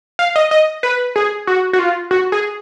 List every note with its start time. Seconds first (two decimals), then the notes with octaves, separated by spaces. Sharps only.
0.19 F5
0.36 D#5
0.51 D#5
0.83 B4
1.16 G#4
1.47 F#4
1.73 F#4
1.79 F4
2.11 F#4
2.32 G#4